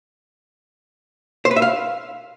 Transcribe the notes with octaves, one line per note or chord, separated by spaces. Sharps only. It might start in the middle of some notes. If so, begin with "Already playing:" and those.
C5
B4
E5
F5